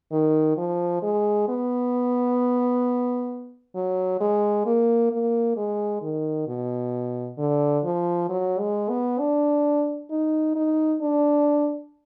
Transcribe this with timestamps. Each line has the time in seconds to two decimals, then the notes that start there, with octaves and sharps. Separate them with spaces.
0.12 D#3
0.58 F3
1.03 G#3
1.48 B3
3.75 F#3
4.21 G#3
4.66 A#3
5.11 A#3
5.57 G#3
6.02 D#3
6.48 B2
7.38 D3
7.84 F3
8.29 F#3
8.59 G#3
8.90 B3
9.19 D4
10.11 D#4
10.56 D#4
11.02 D4